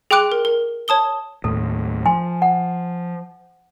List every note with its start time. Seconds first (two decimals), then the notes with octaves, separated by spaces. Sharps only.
0.11 G#4 G5 C6 D6 F#6 D7
0.32 A#4
0.45 A#4
0.88 C#5 A5 D#6 G7
1.44 D#2 A2 A4
2.06 F3 G#5 C6
2.42 F#5